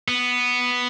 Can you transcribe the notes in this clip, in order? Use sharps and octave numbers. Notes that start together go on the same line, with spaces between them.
B3